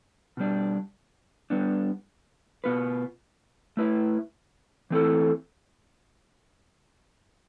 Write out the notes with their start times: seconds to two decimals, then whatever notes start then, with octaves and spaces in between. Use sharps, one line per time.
0.37 B2 G3 D4
1.50 G3 B3 D4
2.64 B2 B3 F4 B4
3.77 A3 E4 B4 E5
4.90 E3 A3 C4 E4 A4